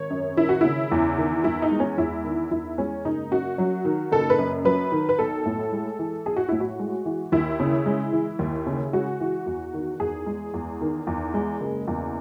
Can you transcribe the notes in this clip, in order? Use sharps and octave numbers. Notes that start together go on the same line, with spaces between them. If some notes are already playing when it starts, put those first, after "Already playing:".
Already playing: G#1 C#5
F#2
G#1 E4
F#4
C#3 E4
E2
D#3
E2 E4
D#4
G#3
C#4
E2 E4
D#3
E2 E4
G#3 C#4
F#1 D#4
F#2 F#4
F#3
D#3
F#1 A4
B4
F#2
F#3 B4
D#3
B4
B1 A4
A2
G#3
E3
B1 G#4
F#4
A2 E4
F#4
G#3
E3
D#2 E4
C#3
G#3
E3
D#2
C#3
G#3 F#4
E3
E2
D#3
E2 G#4
G#3
E2
D#3
E2
G#3
F#1
E2